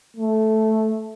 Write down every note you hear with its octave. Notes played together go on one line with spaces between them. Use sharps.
A3